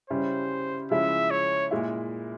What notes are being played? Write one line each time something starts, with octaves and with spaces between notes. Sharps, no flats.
C#3 G3 C#4 E4 C5
C#3 F3 G#3 E4 E5
C#5
A#2 G#3 E4